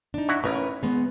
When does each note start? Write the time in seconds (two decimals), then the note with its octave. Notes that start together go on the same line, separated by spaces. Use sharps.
0.14 D4 D#4
0.29 E4 F#4
0.44 A1 C#4 A#4 B4
0.83 G#3 B3